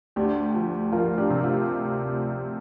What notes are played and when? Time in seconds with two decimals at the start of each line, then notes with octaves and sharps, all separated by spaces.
0.16 D2 D4 G4
0.54 F3
0.92 F3 F4 A#4
1.18 D4 G4
1.30 C3
1.43 F4